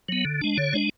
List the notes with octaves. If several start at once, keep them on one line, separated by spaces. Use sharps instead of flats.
F#3 B3
D3
G#3 D4
D3 C#5
G#3 D4